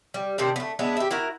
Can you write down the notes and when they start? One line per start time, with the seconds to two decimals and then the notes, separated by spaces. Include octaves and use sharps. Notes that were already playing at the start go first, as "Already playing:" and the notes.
0.14 G3
0.38 C3 D#3 C4 D4
0.56 A3 B3
0.79 G#3 B3 D4 E4
0.97 G4 E5
1.11 E4 F#4 A#4